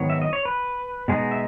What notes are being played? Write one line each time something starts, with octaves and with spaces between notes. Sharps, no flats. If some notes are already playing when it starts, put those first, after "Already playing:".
Already playing: G#2 D#3 F#3 B3 C#5
E5
D#5
C#5
B4
B2 G#3 B3 D#4 G#4
E5